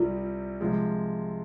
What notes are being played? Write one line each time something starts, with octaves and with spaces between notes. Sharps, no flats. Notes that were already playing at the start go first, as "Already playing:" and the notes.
Already playing: C2 C3 G3 F4
C3 F3 G#3